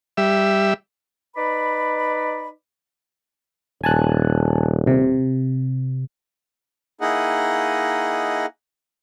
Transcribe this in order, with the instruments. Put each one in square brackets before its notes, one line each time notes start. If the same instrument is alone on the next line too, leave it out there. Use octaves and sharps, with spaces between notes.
[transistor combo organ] G3 E5
[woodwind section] D#4 B4 D5 B5
[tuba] D#1 [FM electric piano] G#5 A5 F#6
[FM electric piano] C3
[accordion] A#3 D#4 E4 G#4 D#5 F#5